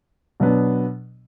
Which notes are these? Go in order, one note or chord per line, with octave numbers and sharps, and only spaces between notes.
B2 F#3 B3 D4